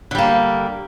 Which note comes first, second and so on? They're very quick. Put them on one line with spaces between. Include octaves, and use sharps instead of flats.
D3 G3 A#3